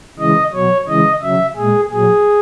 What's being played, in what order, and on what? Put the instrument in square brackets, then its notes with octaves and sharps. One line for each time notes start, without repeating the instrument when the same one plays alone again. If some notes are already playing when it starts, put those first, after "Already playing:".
[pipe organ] C#3 E3 G#3 D#5
B2 F#3 C#5
C#3 E3 G#3 D#5
C#3 F#3 E5
A#2 G#3 G#4
A#2 F#3 G#4